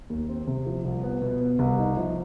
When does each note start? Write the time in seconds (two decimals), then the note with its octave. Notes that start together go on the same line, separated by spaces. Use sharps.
0.10 D#2
0.29 C4
0.47 C3
0.66 F3
0.84 C2
1.03 B3
1.22 B2
1.41 B3
1.59 C2
1.78 D#4
1.97 F3